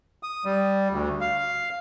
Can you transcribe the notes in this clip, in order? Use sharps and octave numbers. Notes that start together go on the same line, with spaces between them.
D#6
G3
D2
F5